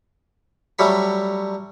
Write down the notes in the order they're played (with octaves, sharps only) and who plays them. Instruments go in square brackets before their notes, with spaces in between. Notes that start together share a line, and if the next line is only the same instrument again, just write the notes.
[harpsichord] F#3 G3 A3 B5